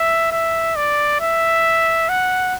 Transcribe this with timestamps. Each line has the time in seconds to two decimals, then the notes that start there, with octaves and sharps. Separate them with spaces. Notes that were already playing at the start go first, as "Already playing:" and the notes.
Already playing: E5
0.32 E5
0.76 D5
1.20 E5
2.09 F#5